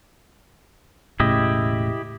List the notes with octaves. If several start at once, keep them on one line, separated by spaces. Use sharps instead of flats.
E1 A2 C#3 E4 G4 D#5